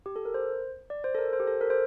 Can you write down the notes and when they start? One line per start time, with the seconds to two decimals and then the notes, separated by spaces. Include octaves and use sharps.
0.06 G4
0.16 A4
0.25 A#4
0.34 C5
0.90 D5
1.04 C5
1.14 A4
1.18 A#4
1.33 C5
1.40 G4
1.47 A4
1.61 A#4
1.70 C5